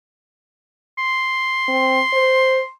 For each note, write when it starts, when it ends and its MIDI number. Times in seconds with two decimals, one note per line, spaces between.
0.98 2.71 84
1.68 2.00 60
2.13 2.61 72